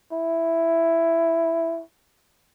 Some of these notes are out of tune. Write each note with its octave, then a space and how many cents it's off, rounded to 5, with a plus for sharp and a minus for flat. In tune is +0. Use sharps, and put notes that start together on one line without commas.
E4 +5